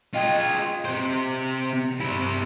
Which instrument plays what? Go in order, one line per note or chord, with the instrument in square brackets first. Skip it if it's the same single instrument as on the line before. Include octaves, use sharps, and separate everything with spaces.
[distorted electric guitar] F4 G#4 [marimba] D#5 G5
[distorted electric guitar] C3 C5
[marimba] G2 [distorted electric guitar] C3 E4